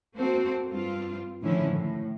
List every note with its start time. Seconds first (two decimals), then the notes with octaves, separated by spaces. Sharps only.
0.15 A#3 C4 F#4 A4 C5
0.69 G2 C4 F4
1.41 A2 D3 D#3 F3 C#4 E4
1.73 A2